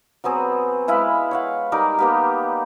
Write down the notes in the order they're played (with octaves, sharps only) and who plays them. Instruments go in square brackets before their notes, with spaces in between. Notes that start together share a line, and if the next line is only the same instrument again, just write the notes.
[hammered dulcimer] F#3 B3 C4 G#4
G#3 E4 B4 F5
C#5 F5 F#5
G3 D#4 A#4 D6
A#3 B3 G4